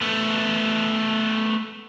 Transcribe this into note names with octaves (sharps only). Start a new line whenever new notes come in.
A3 B3